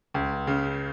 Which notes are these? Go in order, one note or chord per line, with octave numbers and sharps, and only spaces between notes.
C#2
C#3